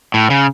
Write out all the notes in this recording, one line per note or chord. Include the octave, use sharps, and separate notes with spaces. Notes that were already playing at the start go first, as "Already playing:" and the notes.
A2
C#3